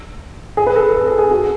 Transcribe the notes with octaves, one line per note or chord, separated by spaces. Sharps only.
G#4
B4
A4
A4
G#4
G#4
F#4